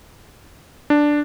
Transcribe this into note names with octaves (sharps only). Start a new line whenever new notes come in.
D4